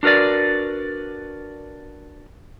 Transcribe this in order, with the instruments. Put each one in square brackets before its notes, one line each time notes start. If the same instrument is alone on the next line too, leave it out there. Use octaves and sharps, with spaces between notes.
[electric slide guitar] D4 F#4 A#4 B4 D5